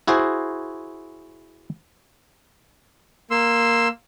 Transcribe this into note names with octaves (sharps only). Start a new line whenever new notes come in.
E4 F#4 G#4 C5
A#3 C6 E6